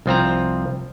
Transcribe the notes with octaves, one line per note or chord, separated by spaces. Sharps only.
C2 F3 C4 A#5